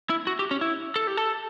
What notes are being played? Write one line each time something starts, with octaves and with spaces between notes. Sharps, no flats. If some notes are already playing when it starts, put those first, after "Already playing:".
E4
F#4
G4
C#4
E4
A4
G4
A4